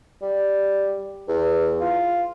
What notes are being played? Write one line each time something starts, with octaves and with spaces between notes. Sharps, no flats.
G3
E2
F4